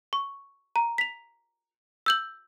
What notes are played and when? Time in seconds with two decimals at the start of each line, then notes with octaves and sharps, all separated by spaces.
0.13 C#6
0.76 A#5
0.98 B6 F7
2.06 E6 G6 F#7